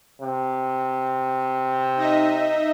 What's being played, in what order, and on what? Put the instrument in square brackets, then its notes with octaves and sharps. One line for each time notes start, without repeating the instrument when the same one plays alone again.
[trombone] C3
[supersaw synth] D#4 D#5 E5